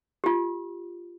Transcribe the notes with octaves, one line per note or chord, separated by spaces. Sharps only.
F4 G4